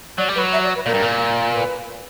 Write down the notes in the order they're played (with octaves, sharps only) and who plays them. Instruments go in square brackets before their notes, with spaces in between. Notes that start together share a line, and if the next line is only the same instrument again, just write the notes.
[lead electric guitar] F#3 [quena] D5
[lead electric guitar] G3
[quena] B4
[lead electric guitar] F#3
[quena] E5
D5
B4
[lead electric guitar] A#2 [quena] A#4
[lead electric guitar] G2
A#2
[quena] B4